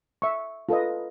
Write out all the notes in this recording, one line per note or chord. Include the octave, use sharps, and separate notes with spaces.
E5 C#6
F4 A4 B4 D#5